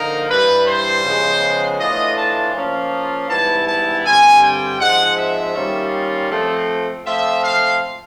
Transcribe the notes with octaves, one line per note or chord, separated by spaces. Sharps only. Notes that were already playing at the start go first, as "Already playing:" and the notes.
Already playing: D3 F3 A#3 D#4 A#4
G2 E3 G3 B4
C5
C#3 F3 G#3 B3
A2 E3 A3 D4 F4 D#5
A5
F3 A#3 C#4 F4
G#2 E3 G3 B3 E4 A5
A5
G2 D3 G3 C4 G#5
G5
G#2 F3 G#3 C4 F#5
E5
D#3 G3 A#3 C#4 F4
F3 A3 C4
F3 A3 C4 F4 E5
F5